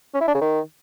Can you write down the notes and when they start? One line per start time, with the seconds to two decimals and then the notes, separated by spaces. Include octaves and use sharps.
0.14 C#4
0.21 E4
0.28 D4
0.34 C#3
0.41 D#3